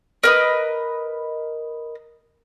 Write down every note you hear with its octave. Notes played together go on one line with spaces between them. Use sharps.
A#4 B4 D#5